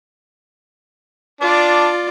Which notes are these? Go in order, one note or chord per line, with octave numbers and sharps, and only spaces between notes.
D4 F4 D5